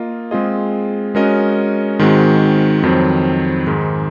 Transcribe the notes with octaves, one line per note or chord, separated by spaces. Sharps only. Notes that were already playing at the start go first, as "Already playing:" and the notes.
Already playing: A#3 F4 A#4 D#5
G#3 C4 F4 G#4 D#5
G#3 C#4 F#4 A#4 D#5
G#2 D#3 G#3 C4 F#4
F2 D#3 F#3 C4
G#2 D#3 G#3